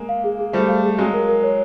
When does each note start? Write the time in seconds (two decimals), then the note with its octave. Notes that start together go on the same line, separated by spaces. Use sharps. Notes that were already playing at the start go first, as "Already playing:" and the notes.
Already playing: G#3 A#3
0.09 F5
0.24 G#4
0.39 G#4
0.53 G3 A3 C5
0.68 F5
0.84 G#4
0.98 F#3 G#3 F5
1.13 A#4
1.28 A#4
1.43 C#5